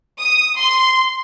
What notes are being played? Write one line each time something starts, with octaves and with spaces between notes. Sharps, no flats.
D#6
C6